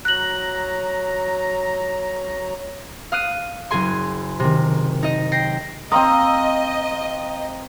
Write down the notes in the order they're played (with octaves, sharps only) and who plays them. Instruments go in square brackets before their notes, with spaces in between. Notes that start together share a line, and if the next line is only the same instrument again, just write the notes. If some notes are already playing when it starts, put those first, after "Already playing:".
[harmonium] F#3 A#5 [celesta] F#6 F#7
[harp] F5 D#6 F#6 D#7
F#1 C#3 G#4 G#5 C6
C3 D#3
D#4 D#5
G5 A#6 C7
[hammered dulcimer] C4 F5 A#5 [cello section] D#5 [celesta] G5 C6 D#6